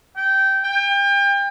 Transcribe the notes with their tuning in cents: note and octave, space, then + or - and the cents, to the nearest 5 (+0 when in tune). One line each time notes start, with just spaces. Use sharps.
G5 -15
G5 +35